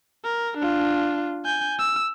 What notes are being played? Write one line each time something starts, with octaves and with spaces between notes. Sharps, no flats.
A#4
D4 F4
G#5 G6
E6